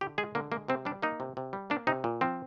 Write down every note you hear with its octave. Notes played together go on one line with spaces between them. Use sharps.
D3 G4
G#3 G#4
D3 A#3
G#3 A#3
C3 C4
G3 D4
A#3 D#4
C3
C3
G3
A#3 D4
C3 D#4
A#2
F3 C4